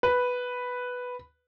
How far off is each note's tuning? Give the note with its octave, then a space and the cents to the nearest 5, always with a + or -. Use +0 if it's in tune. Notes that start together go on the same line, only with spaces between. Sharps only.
B4 +0